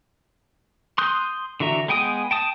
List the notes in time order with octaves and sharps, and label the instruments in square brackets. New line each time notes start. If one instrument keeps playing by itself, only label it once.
[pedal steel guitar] C6 D#6 F#6 G6
D3 E3 F#4 E5 A#5
G#3 B3 G5 G#5 D#6
G5 A5 D#6